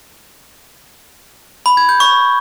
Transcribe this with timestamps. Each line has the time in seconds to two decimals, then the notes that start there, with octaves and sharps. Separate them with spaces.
1.66 B5
1.77 G#6
1.89 G6
2.00 C#6